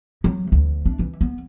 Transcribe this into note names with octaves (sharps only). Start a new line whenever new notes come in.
F#3
D2
D4
E3
B3